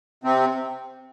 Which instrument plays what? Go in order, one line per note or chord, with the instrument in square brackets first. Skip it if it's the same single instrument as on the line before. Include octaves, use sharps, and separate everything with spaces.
[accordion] C3 C4